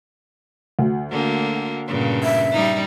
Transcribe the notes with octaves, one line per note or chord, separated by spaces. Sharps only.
D2
D3 A#3
G2 A#2 C#3
E5
G3 D#4